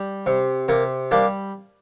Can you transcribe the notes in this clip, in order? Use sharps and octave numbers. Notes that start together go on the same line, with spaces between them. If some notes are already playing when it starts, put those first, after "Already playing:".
Already playing: G3
C3
C3 A#3
G3 A#3 D4